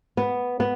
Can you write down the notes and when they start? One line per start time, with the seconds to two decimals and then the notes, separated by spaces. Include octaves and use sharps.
0.17 B3
0.60 B3